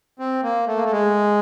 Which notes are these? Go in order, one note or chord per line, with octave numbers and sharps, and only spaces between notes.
C4
A#3
A3
A#3
A3
G#3